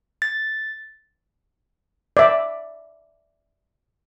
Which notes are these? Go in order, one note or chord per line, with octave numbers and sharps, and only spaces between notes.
A6
D5 E5